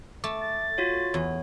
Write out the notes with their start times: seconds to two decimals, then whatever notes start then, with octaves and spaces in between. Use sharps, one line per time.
0.24 A3 D6
0.41 A6
0.78 F4 F#4 C#5
1.14 E2 C#5